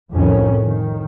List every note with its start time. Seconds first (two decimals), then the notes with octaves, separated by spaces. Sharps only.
0.11 C2 F2 A2 D#3 C#4
0.65 D#3